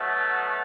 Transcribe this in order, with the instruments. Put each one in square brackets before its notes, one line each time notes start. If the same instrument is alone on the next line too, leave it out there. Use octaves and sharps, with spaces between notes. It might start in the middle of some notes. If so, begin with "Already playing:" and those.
Already playing: [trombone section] B2 F#3 A3